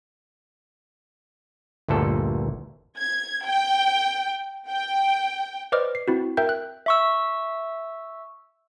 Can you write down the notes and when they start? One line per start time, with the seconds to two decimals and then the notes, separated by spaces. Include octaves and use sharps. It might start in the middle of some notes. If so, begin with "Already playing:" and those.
1.88 G1 D2 A#2 A4
2.99 G#6
3.45 G5
4.68 G5
5.72 B4 C5 D5 D#5 D6 F6
5.95 C7
6.08 C4 E4 F#4
6.37 A#4 E5 G5 G6
6.49 F#6
6.86 E5 C#6 E6